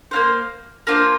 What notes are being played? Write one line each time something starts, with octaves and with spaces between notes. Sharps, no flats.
A#3 D4 F4 C5
A#3 D4 F4 C5